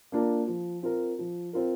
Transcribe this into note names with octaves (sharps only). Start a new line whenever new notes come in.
A#3 D4 F4 A#4
F3
C4 F4 A#4
F3
C4 F4 A#4